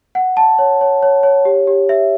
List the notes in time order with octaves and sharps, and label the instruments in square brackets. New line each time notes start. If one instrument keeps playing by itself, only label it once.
[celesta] F#5
A5
C#5
C#5
C#5
C#5
G4
G4
E5